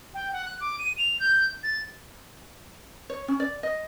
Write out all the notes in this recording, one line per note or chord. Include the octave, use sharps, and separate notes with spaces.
G5
F#5
F#6
D6
D#7
F7
G6
A6
C#5
C#4
D5
D#5